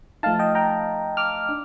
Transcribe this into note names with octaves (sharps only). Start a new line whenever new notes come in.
F3 A3 D#4 F5 A5
D#5 G5
G5 A#5
D6 F6
D4